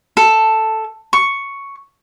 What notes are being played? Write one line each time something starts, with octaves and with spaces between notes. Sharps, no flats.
A4
C#6